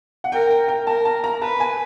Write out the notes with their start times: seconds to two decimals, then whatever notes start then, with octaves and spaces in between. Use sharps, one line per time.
0.24 F#5
0.32 A#4 G5
0.50 G5
0.68 G5
0.87 A#4 A5
1.05 A5
1.24 A#5
1.41 B4 A5
1.60 G#5